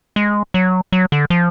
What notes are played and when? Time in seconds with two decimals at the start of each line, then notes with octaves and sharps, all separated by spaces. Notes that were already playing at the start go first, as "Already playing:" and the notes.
0.16 G#3
0.54 F#3
0.92 F#3
1.12 D3
1.30 F3